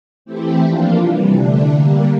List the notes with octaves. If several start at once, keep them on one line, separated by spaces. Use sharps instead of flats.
E3 A3 C4 E4 G4
F3 A#3 D4 F4
C3 E3 G3
D3 A3 D4
D3 G3 A#3